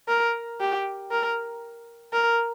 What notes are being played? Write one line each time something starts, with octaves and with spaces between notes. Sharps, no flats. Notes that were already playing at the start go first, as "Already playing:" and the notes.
A#4
G4
A#4
A#4